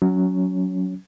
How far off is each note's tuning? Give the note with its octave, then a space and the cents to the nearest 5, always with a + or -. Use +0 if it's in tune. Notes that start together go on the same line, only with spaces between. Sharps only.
F#3 +0 C#4 +20